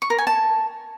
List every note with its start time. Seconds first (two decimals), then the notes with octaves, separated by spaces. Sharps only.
0.02 C#6
0.10 A#4
0.18 G#5
0.27 A5